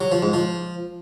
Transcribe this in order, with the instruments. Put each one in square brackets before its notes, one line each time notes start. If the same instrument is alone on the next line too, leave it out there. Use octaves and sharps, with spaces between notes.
[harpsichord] F#3
F3
G#2
F3